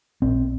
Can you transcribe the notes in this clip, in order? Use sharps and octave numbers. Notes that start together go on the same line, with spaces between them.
A#1 C4